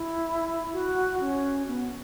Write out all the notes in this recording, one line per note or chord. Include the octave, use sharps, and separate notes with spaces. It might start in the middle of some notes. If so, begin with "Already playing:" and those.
Already playing: E4
F#4
C#4
B3